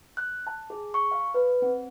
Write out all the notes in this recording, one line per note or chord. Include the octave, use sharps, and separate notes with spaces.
F#6
A5
G#4
C#6
F5
B4
C4